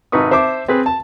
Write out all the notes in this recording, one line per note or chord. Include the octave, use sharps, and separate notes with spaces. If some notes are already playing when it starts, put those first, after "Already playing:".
G#1 C3 D#4 B4 C#6 D#6
C5 E5 A5 D6
C4 G#4 B4
A5